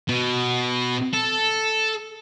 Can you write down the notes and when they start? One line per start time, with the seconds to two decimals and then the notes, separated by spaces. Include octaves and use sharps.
0.09 B2
1.14 A4